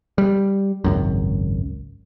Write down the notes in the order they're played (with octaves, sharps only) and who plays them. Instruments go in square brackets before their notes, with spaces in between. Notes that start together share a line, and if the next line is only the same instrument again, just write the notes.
[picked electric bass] G3
G#1 C#2 F#2